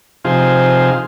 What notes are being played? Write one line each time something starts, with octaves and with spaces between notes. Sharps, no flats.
C3 F3 D#4 F4 G#4 C5